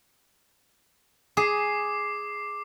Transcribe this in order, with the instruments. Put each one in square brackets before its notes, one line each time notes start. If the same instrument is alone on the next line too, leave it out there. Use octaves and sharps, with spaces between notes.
[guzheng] G#4 [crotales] D6 C7